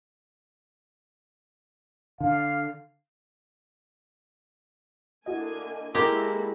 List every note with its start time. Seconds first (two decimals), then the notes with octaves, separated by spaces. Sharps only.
2.20 D3 F5
5.26 D3 A#3 E4 F#4 D#5 G#5
5.95 G#3 A#3 E4 F#4 G4 A4 A#4 A#6